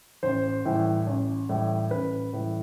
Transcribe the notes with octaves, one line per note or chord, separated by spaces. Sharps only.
A1 C5
A2 E3 G3
A1
A2 E3 G3
A1 B4
A2 E3 G3